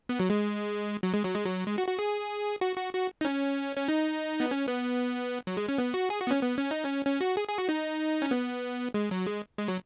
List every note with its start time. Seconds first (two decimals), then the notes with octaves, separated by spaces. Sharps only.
0.09 B3
0.20 F#3
0.30 G#3
1.03 F#3
1.14 G#3
1.25 F#3
1.35 G#3
1.45 F#3
1.67 G#3
1.78 F#4
1.88 F#4
1.99 G#4
2.61 F#4
2.77 F#4
2.93 F#4
3.21 D#4
3.25 C#4
3.77 C#4
3.88 D#4
4.40 B3
4.51 C#4
4.68 B3
5.47 F#3
5.57 G#3
5.68 C#4
5.78 B3
5.94 F#4
6.10 G#4
6.21 F#4
6.27 B3
6.31 C#4
6.42 B3
6.58 C#4
6.71 D#4
6.84 C#4
7.06 C#4
7.21 F#4
7.37 G#4
7.48 G#4
7.58 F#4
7.69 D#4
8.22 C#4
8.31 B3
8.94 G#3
9.11 F#3
9.27 G#3
9.58 G#3
9.68 F#3